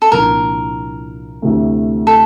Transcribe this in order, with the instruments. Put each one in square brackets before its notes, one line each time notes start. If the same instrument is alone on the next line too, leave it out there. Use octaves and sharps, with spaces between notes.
[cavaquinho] A4
[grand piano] C2 A#2 F3 A#3 D4 [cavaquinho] A#4
[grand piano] D2 C3 E3 A3
[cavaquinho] A4